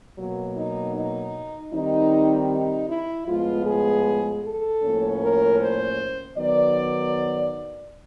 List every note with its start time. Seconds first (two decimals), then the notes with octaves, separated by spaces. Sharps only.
0.19 B2 F#3 A#3
0.57 D#4
0.96 D#4
1.73 D#3 G3 C4 D#4
2.51 D#4
2.89 E4
3.28 A2 F3 G#3 B3 F4
3.67 G#4
4.44 A4
4.83 A2 F3 A#3 C#4
5.22 A#4
5.60 C5
6.37 D#3 F#3 B3 D5